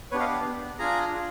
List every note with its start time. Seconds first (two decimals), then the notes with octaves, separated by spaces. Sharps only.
0.11 B3 D4 G4 B4 C#5
0.20 D#5 F5
0.45 B3 D4 G4
0.78 D4 F4 G#4 G#5 A#5
1.12 D4 F4 G#4